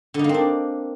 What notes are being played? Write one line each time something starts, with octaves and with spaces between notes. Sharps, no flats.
D3
D#4
A#3
C4
D4